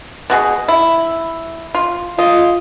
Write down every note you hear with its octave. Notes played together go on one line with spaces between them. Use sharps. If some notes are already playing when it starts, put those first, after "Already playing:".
B2 F#4 G#4
E4
F4
F4 D#5